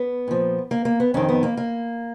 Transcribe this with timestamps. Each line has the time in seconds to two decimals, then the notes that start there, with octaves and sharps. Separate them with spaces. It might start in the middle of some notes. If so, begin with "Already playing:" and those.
Already playing: B3
0.28 A#2 F3
0.71 A#3
0.85 A#3
1.00 B3
1.14 F2 D#3 C#4
1.29 B3
1.43 A#3
1.57 A#3